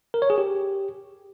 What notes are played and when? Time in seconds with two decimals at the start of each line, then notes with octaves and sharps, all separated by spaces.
0.14 A#4
0.22 C#5
0.30 G#4
0.38 G4